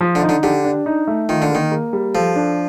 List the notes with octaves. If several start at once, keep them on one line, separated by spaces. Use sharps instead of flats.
F3
D3
D#4
D3
D3 G4
D4
D#4
A3
D#3 F4
D3
D#3 A#3
A#3
G3
F3 A4
D4